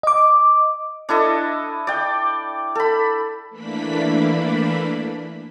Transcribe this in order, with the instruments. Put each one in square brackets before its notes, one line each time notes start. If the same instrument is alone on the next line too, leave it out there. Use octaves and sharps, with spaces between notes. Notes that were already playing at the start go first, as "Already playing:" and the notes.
[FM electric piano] D#5 D6
[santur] D4 E4 A4 D#5
D5 G5
A4 B5
[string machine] E3 A3 A#3 D4 B5 B6